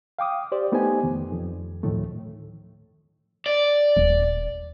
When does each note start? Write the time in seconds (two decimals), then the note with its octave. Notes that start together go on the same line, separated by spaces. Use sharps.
0.19 F5 G5 D6 D#6
0.52 G4 C5 D5
0.72 A3 B3 D#4 G4 C5 G#5
1.03 F2 D#3
1.32 F2
1.83 D2 A2 D#3 F3 A3
3.46 D5
3.97 D#1